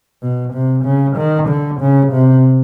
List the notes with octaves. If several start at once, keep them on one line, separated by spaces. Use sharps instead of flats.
B2
C3
C#3
D#3
D3
C#3
C3